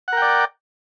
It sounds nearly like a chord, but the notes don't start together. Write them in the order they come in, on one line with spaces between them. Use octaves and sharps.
F#5 A#4 G5 D5